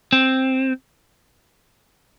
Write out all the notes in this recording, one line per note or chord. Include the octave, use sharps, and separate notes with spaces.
C4